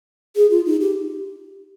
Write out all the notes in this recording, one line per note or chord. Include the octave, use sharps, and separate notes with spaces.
G#4
F4
D#4
G4